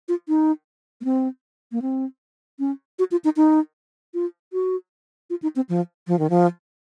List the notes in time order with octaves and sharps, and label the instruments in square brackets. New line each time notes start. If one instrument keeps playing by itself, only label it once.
[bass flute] F4
D#4
A#3
C4
A#3
C4
C#4
F#4
F4
D#4
D#4
F4
F#4
F4
D#4
C4
F3
F3
D#3
F3